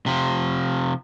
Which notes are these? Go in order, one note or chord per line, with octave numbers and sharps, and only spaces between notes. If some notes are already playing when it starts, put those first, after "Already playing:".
C3 F3